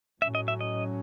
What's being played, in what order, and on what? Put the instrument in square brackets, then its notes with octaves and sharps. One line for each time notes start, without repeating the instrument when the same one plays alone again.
[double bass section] A2 F#3 C#4 [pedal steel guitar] E5
[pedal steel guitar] D#5
E5
D#5